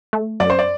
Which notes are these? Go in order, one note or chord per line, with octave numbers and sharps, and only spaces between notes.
A3
F#2 D5
C5
D5